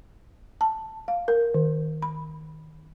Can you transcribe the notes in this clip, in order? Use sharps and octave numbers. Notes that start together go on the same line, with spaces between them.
A5
F5
A#4
D#3
B5